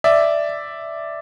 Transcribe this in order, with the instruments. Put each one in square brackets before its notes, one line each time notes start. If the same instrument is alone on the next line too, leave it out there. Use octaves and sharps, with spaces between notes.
[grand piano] D5 E5